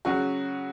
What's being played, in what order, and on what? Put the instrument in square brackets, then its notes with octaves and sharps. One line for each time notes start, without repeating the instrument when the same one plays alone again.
[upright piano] C#3 F#3 F#4